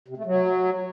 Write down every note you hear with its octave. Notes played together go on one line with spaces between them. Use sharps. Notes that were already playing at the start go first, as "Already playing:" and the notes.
C3
A3
F#3